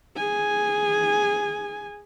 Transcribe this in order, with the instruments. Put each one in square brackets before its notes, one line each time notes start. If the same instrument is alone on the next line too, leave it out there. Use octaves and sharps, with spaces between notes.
[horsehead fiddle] G#4 G#5